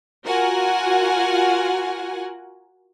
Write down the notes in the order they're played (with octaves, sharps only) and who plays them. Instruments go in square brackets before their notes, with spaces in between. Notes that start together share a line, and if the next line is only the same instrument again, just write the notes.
[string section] F4 F#4 A#4 F#5 G#5